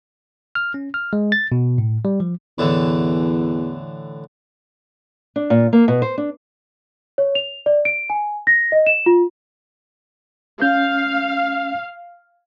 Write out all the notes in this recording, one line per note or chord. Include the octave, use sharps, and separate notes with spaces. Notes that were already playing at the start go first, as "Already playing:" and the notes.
F6
C#4
F6
G#3
A6
B2
A2
G3
F3
E2 A2 D3 E3
D4
A#2
A#3
B2
C5
D4
C#5
F7
D5
D7
G#5
A#6
D#5
E7
F4
C#4 F5 G6